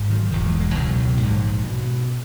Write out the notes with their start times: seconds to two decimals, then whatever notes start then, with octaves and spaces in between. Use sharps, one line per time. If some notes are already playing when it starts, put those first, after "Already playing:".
Already playing: G#1 G#2
0.10 D#3 F#3
0.31 E1 E2 B2 D#3 F#3
0.46 E3 G#3
0.60 E3 G#3
0.75 C#2 B2 D#3 F#3
1.17 A#1 G#2
1.65 B2